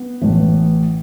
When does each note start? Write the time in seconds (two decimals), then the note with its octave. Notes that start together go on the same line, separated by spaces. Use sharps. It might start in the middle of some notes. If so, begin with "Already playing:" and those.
Already playing: B3
0.21 A1 A2 E3